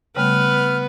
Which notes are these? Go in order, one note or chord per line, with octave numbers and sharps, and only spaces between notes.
C#3 G3 A3 B3 B4 F6